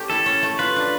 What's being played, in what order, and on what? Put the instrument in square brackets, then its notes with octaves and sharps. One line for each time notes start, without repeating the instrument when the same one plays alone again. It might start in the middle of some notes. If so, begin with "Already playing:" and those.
Already playing: [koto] A3 C#4 G4
[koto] E4 [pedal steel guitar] A4
[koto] C#4
A3
[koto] F4 [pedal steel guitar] B4
[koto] D4